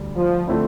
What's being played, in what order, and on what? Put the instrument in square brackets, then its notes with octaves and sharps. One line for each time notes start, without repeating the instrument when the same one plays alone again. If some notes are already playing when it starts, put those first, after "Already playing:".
Already playing: [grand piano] D2 D3 G3
[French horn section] F3
[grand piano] D3 F3 A3 C4 E4